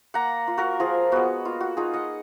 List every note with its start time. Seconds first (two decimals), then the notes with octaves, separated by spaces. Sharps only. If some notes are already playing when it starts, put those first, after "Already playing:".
0.14 A#3 F#5 A#5
0.48 F4
0.58 F#4 A#4
0.80 F3 F4 G#4
1.12 G#3 B3 F#4
1.45 A#3 F4
1.61 F#4
1.77 D#4 F4 G#4
1.94 D#5 F#5